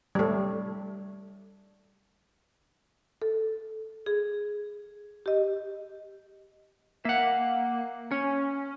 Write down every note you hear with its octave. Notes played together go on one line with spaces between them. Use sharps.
G3 A3
A4
G#4
G4 D#5
A#3 E5 F#5
C#4 C#5